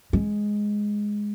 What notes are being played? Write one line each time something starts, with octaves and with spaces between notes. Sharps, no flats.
G#3